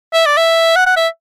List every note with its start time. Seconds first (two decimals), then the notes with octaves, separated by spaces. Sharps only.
0.13 E5
0.26 D5
0.37 E5
0.76 F#5
0.86 F#5
0.97 E5